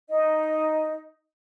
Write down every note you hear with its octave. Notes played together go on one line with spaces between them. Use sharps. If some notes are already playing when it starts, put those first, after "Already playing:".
D#4 D#5